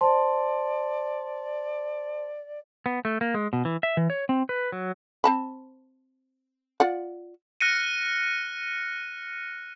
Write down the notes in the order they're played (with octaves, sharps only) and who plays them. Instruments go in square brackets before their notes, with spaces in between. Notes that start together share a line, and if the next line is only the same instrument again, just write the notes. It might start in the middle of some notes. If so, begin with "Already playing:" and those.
[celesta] C5 A5 C6 [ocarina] D5
[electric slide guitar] B3
A3
A#3
G#3
B2
E3
E5
E3
C#5
C4
B4
F#3
[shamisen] C4 A5 B5
F4 D5 F#5
[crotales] F6 F#6 A#6 C#7 D#7